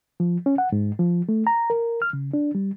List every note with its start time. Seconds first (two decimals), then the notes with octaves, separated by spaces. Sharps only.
0.20 F3
0.46 C#4
0.58 F#5
0.72 G#2
0.99 F3
1.29 A3
1.47 A#5
1.70 A#4
2.02 F6
2.13 C#3
2.34 D4
2.55 G3